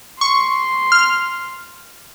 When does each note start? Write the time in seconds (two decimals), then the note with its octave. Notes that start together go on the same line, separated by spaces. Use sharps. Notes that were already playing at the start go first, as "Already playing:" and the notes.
0.21 C6 C#6
0.92 F6